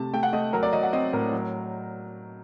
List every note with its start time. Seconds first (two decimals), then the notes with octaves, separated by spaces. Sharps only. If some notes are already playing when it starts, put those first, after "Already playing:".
Already playing: C3 A3 A5
0.13 A3 G5
0.23 F#5
0.33 A3 D#5
0.53 F#3 A#4
0.63 D5
0.73 F#3 D#5
0.83 F#5
0.93 C4 D#5
1.13 A2 A#4
1.33 F#3